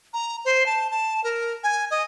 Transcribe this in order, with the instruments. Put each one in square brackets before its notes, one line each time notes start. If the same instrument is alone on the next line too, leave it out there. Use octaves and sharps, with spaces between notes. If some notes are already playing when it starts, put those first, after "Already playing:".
[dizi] A#5
C5
A5
A5
A#4
G#5
D#5